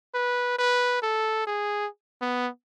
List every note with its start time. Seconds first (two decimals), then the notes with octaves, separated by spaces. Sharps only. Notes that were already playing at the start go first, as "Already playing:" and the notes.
0.14 B4
0.58 B4
1.02 A4
1.47 G#4
2.21 B3